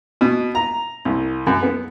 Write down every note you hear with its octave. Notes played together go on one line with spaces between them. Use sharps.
B2
A#5
C2
F#2
B3